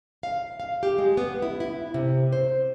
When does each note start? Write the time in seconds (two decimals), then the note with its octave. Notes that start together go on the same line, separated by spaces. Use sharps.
0.23 F5
0.60 F5
0.83 G4
0.98 G#3
1.17 B3
1.42 E4
1.60 E4
1.94 C3
2.33 C5